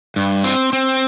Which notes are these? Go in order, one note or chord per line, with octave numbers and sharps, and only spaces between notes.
G2
C4
C4